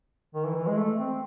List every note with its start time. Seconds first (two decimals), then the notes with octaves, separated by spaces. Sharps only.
0.35 D#3
0.45 E3
0.56 E3
0.67 G#3
0.77 A3
0.98 C4